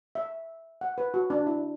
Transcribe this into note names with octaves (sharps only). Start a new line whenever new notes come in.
E5
F#5
B4
F#4
D4
E4